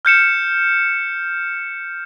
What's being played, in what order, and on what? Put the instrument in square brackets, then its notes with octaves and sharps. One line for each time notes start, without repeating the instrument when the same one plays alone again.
[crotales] F6 G6 C#7 E7